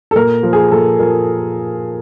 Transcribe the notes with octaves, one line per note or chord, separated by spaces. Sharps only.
A4
A#2 A#4
F3
G#4
A#2 A4
F3 A#4